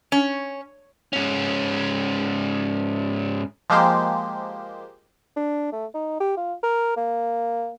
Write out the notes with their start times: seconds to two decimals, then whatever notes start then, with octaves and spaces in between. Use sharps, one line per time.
0.12 C#4
1.13 G#2 C#4
3.70 F3 G#3 A#3 G4 C5
5.36 D4
5.72 A3
5.94 D#4
6.20 G4
6.37 F4
6.63 A#4
6.96 A#3